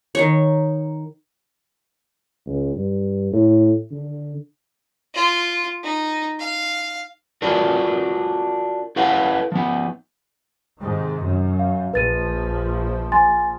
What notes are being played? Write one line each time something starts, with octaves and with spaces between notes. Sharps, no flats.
D#3 C#5
C#2
G2
A2
D3
F4
D#4
F5
D4 F4 F#4 A#4
E4 A4 B4 F5 F#5
F3 B3
G#2 C3 D#3
F#2
F5
A#1 F3 B4 A6 D#7
G#5 C6 A6